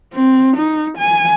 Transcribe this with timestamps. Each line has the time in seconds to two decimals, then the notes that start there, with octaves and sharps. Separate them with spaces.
0.14 C4
0.56 D#4
0.98 G#5